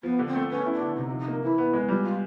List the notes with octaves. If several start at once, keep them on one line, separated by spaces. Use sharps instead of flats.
F3 B3
D3
C4
A3
B3 C#4
E4
D4
D3
C3 D#4
F3
D#4
A#3
E3 E4
B3
G#3
G3 F4
F4